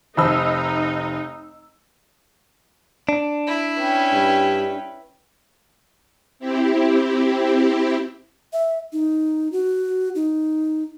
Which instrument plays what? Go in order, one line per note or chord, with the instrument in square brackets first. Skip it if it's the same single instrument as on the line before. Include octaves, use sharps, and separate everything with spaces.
[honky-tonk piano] F1 D#5 E6 [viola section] D#4 [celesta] C5 A5 B5
[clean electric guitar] D4
[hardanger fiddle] E4
[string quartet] C#4 B4 G5
[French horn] G2
[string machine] C4 E4 G4
[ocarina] E5
D#4
F#4
D#4